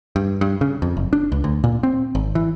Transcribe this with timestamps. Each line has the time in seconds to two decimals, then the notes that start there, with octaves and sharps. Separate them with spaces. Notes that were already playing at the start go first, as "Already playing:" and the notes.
0.16 G2
0.41 G2
0.61 C#3
0.82 F2
0.97 F#1
1.13 D4
1.32 C#2
1.44 D2
1.64 A#2
1.83 C4
2.15 G#1
2.35 E3